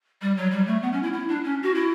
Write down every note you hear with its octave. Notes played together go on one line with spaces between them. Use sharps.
G3
F#3
G3
A3
B3
C#4
E4
E4
D4
C#4
F#4
E4